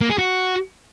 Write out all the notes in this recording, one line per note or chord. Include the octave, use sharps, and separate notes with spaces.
A#3
G#4
F#4